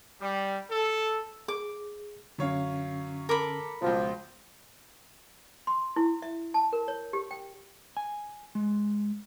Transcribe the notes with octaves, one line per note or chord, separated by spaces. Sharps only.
G3
A4
G#4 D6
F#2 D3 C#4 C#5 F5
A4 A#4 B5 D6
C#2 B2 F3
C6
E4
E5
A5
A#4
C#5
G4
G5
G#5
G#3